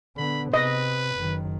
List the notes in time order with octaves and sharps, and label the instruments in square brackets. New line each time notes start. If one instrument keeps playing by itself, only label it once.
[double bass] D3 B3 [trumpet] B5
[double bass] C3 [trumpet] B4 [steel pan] D#5
[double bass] F#1 D#3